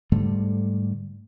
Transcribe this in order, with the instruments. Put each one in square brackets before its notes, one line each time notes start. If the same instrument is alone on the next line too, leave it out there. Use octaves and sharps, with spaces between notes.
[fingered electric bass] G#2 D3 G3 A3